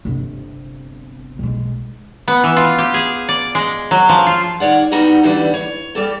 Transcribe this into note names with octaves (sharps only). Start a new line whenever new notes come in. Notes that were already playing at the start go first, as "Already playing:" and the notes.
G1 C3
B1 G#3
B3
E3
F4
G4
G#4
D5
G#3
F#3
F3
F4
D#3 C#5 D5 F#5
G3 B3 D#4 F#4 G4
D3 E3 G3 B3 D4
C#5
G3 G4 A4